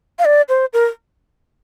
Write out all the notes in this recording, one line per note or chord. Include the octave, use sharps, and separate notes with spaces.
F5
D5
C5
A#4